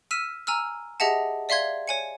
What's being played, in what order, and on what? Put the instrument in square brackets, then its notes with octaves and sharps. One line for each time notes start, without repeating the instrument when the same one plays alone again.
[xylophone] E6 F6 B6 D#7 E7
G#5 A#5 E6 F6
G4 G#4 D#5 E5 F#5 A5
D5 E5 F5 C6 G#6
C#5 G#5 C#7